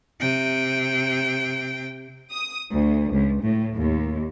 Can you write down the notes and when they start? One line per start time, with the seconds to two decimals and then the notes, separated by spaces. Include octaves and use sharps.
0.20 C3 G5
2.31 D#6
2.72 D2
3.12 C#2
3.42 A2
3.77 D#2